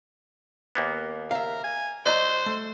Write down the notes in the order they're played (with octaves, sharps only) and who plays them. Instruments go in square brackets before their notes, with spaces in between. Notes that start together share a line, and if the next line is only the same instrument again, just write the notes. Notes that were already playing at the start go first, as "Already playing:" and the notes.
[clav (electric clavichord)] D#2 A#3 B3
[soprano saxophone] A#4 [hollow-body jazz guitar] E5 F5
[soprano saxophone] G#5
[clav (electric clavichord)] F#3 [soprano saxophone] C5 [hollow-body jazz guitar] D5 D#5 A#5
[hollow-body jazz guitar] A3